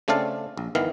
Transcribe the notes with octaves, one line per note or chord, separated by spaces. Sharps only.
C#3 A3 C4 D4 F5 A5
A#1
G1 D#3 E3 B3 F5